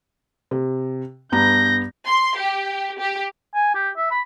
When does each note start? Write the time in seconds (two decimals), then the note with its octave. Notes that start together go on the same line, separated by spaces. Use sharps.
0.51 C3
1.32 G2 B3 A#5 G6 A#6
2.07 C6
2.37 G4
3.00 G4
3.55 G#5
3.75 G4
3.97 E5
4.11 B5